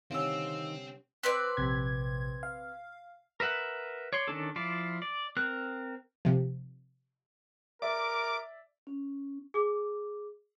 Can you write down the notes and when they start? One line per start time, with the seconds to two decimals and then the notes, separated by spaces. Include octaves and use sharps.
0.11 C2 D3 D#3 C4 C#4 F5 E6
1.23 C4 B4 D5 F#6
1.57 A#1 C3 G#6
2.43 F5
3.40 A#4 B4 E5 F#5
4.13 C#5 D5 C6
4.28 D#3 C#4 D4 A4
4.56 F3 E4 F4 D5
5.02 D5
5.37 C4 A#4 F#6
6.25 C3 F3
7.82 A#4 D5 E5 D6
8.87 C#4
9.54 G#4 D6